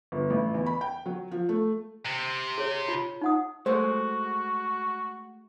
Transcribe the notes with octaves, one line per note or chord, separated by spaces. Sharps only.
G1
A1
E2
B5
G5
F#3
F3
A3
C3
G#4 C#5
F4
D#4 F#5 D#6
G#3 A3 F#4 C5